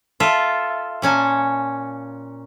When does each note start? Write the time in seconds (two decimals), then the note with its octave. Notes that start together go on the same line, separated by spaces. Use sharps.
0.20 F4 A4 E5
1.02 A#2 C#4 G#5 A5